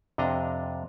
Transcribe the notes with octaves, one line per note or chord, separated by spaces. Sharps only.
F2 C3 D4 D#5 A#5